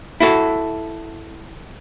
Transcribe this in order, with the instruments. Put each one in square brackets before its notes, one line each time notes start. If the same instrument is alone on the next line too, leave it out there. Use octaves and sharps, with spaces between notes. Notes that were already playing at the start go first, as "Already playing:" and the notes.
[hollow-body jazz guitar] E4 F#4 A4